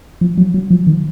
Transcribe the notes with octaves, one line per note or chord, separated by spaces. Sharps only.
F3
F#3
F#3
F3
D#3